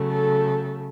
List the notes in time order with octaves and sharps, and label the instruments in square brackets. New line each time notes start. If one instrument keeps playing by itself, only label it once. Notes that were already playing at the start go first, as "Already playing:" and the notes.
Already playing: [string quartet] C#3 F#3 A3
A4